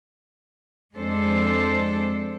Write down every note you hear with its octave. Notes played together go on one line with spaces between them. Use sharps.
F2 G#3 D4 A4 C5